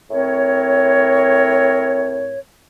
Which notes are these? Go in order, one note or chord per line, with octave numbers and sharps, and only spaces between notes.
A2 C4 A#4 C#5